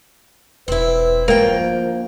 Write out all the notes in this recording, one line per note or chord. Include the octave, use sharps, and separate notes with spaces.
E1 C4 E4 B4
D2 F3 G3 A#3 G5